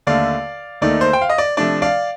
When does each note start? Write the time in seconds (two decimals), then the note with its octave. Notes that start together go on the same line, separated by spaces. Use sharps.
0.07 D#2 D3 A3 D5 F5
0.81 D#2 D#3 A3 D#4 D5
1.01 C5
1.13 G5
1.21 F5
1.30 D#5
1.38 D5
1.57 C3 F3 A3 D4 D5
1.82 D5 F5